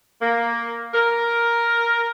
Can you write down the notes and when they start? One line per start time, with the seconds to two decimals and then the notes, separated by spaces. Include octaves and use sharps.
0.22 A#3
0.94 A#4